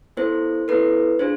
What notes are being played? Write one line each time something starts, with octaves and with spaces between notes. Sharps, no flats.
B3 E4 A4 C5
B3 E4 A4 B4
D4 F4 G#4 C5